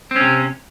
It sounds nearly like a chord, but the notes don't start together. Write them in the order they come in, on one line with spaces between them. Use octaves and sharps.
C4 C#4 C3